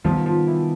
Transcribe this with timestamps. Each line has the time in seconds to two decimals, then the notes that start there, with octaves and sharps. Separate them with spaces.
0.04 C3 D#3 F3 G3 B3 F4
0.26 F3 F4
0.47 E3 E4